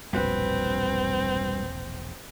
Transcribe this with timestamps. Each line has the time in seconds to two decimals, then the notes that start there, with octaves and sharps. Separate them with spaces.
0.13 E1 A#1 G2 C4 F#4 B4